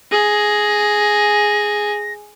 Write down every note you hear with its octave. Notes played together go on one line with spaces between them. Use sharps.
G#4 A#6